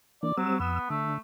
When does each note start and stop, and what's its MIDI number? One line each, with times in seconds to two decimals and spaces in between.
0.23 0.32 52
0.23 0.32 58
0.23 0.32 62
0.23 0.34 74
0.37 0.55 54
0.37 0.59 55
0.37 0.59 60
0.37 0.59 88
0.59 0.79 41
0.59 0.90 59
0.59 0.79 88
0.90 1.18 50
0.90 1.15 57